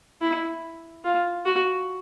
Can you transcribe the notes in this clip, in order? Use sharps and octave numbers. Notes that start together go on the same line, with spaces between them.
E4
F4
F#4